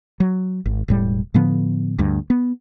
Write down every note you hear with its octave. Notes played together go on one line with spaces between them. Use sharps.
F#3
G#1
E1 A2 G3
A2 D3 F3 B3
D2 G2
B3